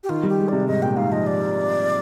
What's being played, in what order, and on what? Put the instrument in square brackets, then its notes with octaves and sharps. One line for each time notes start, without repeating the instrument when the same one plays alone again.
[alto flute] G4
[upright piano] D#3 [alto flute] F4
[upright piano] G3
[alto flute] G4
[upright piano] G#3
[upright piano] C3 [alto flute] D5
[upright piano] G#2 [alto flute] D#5
[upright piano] A#2 [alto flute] G5
[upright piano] G#2 [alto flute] F5
[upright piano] F3 [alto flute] D#5
[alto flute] D5